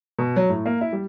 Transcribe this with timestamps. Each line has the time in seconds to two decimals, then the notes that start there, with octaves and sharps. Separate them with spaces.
0.18 B2
0.36 F#3
0.49 A2
0.66 A#3
0.81 E4
0.93 G3